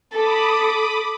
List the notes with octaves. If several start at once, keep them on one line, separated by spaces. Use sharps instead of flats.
A4 B5 D6 D#6